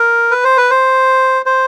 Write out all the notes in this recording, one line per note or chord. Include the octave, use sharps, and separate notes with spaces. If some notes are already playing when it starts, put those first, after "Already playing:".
Already playing: A#4
B4
C5
B4
C5
C5